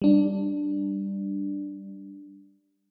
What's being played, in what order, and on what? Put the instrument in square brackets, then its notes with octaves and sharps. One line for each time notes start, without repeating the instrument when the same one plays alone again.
[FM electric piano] G3 D4